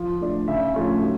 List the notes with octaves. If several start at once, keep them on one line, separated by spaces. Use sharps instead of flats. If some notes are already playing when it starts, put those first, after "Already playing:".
Already playing: F3
A3 D4
C#3 E5
F3 A3 C#4
F#3